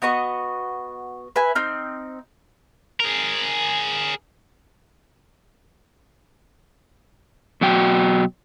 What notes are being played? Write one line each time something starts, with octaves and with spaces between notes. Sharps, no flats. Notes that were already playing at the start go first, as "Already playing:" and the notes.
B3 F#4 D#5 C#6
B4 E5 G#5
C4 D#4 F6
G#4 A#4
B2 F#3 F#4 G5